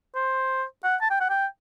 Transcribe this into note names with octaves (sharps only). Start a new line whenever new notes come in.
C5
F#5
A5
G5
F#5
G5